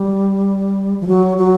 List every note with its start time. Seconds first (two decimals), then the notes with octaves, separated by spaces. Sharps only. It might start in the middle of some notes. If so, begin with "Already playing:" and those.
Already playing: G3
1.00 F3
1.07 F#3
1.38 F#3